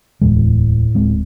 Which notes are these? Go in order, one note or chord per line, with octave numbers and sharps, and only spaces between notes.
D1 E2 A2 G#3
D1 G#3 C4